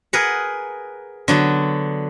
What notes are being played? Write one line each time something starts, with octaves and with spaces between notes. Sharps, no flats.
G#4 A#4 B4 F#5
D3 F#3 B3